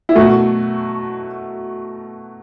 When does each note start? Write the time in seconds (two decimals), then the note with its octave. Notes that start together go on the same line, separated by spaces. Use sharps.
0.09 E4
0.15 B2 F#3 A3 F#4